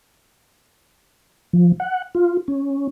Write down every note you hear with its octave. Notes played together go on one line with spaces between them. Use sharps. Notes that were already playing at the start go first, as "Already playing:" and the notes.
F3
F#5
F4
C#4